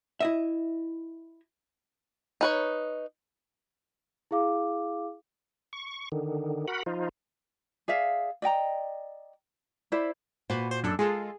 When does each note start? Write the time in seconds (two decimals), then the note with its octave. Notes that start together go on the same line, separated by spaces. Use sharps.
0.20 E4 D#5 E5
2.41 D#4 B4 C#5
4.31 E4 G#4 F5 D6
5.73 C#6
6.12 D3 D#3
6.68 F#4 A#4 F#5 B5
6.86 F3 D#4 F4
7.88 G#4 D5 E5 F5
8.42 D5 D#5 G5 A#5
9.92 E4 C5 D5 B5
10.50 A#2 F#4 B4 C5
10.71 C5
10.83 F#2 D4 A4
10.99 G#3 F4 G#4 A4